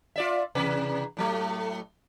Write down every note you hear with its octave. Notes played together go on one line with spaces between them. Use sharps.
F4 D5 E5
E2 C3 B4
A2 F#3 A3